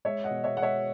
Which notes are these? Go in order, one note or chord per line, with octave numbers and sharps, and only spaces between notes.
G#3 C#5 E5
D#5 F#5
B2
C#5 E5
G#3 F#5
C#5 E5